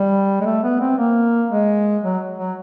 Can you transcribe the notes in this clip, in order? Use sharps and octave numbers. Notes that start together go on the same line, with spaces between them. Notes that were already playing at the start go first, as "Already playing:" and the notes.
Already playing: G3
G#3
A3
B3
C4
A#3
G#3
F#3
F#3